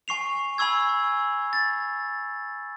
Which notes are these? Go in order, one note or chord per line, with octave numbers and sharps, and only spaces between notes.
G#5 C#6 C7 F7
G#5 B5 C#6 E6 G#6
A6